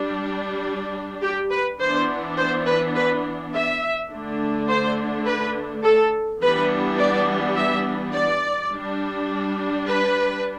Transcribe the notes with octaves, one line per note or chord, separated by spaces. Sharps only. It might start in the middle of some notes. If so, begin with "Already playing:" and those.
Already playing: G3 D4
G4
B4
E3 B3 D4 C5
C5
B4
B4
E5
D3 A3 D4
C5
B4
A4
E3 G3 B3 D4 B4
D5
E5
D5
G3 D4
B4